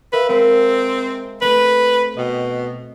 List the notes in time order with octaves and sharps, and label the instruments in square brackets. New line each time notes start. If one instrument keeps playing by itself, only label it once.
[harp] A#4 E5 F5 [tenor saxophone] B4
[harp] G#3 [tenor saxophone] C4
[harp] A3 C4 [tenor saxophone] B4
[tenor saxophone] B2 [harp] D#5 G5